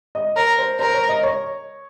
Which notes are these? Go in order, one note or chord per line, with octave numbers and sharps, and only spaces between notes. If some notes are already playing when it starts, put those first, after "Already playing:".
D#5
A#4 C#5
C5
A#4 C5
C#5
D#5
C#5